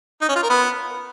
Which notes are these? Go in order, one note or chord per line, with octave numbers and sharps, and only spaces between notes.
D#4
C#4
F4
A#4
B3